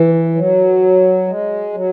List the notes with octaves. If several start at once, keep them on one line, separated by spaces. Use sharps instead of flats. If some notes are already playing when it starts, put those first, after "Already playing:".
Already playing: E3
F#3
G#3
F#3